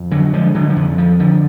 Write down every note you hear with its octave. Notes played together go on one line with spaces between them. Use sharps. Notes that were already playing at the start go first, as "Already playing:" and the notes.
Already playing: F2
D3 F#3
D3 F3 G#3
D3 F#3
F3
F2 D3
F3
D3 F3